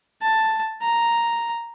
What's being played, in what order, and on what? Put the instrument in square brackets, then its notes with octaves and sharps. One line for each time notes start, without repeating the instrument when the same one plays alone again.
[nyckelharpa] A5
A#5